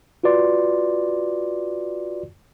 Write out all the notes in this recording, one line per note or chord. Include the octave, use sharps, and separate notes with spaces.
F4 F#4 B4 D5 C6